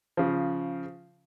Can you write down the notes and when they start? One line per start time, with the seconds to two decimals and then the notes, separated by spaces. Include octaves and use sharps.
0.17 C#3 F3